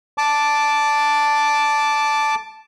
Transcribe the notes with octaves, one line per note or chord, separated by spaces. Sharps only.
A5 D6